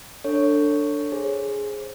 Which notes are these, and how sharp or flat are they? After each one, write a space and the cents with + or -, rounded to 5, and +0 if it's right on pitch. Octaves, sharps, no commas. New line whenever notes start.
D4 +0 A4 +30 C#5 +0
G#4 +0 C5 +15